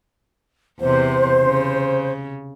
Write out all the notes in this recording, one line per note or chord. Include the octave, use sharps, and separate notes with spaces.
E2 C3 C5
C#3